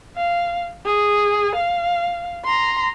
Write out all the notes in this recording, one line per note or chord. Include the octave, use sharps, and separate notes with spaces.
F5
G#4
F5
A#5 C6